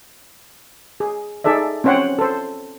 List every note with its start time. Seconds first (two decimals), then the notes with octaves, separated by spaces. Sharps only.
1.00 G#4
1.44 D#4 G#4 A4 D5 E5
1.84 C4 C#4 C5 C#5 F#5 G5
2.19 A4 C5